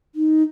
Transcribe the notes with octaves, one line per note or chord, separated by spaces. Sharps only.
D#4